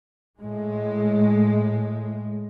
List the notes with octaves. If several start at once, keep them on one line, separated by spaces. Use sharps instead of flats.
A2 G#3